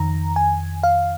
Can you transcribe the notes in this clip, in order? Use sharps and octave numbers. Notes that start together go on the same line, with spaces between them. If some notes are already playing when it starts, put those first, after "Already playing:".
Already playing: F2 D#3 A#5
G#5
F5